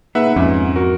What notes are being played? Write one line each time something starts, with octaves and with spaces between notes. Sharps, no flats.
A#3 D#4 G#4 B4 E5 F#5
F2 G#2 C#4
F#4 A#4